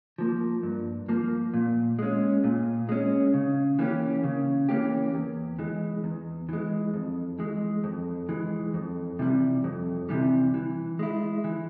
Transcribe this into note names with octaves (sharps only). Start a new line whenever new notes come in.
F3 A#3
G2
F3 A#3
A#2
G#3 C#4
A#2
G#3 C#4
C#3
E3 A#3 C#4 G4
C#3
E3 A#3 C#4 G4
E2
E3 G#3
E2
E3 G#3
F2
E3 G#3
F2
E3 G#3
F2
C3 E3 G3
F2
C3 E3 G3
E3
G#3 E4
E3